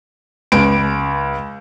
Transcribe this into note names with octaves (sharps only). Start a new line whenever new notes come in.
C#2 D7